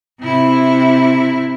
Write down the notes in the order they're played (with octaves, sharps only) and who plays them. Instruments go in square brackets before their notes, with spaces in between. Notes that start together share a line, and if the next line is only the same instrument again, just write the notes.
[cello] C3 E4